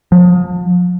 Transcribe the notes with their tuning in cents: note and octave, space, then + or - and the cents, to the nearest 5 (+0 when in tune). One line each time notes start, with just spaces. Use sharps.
F3 +35